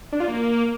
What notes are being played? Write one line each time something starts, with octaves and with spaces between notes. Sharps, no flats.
D4
F4
A#3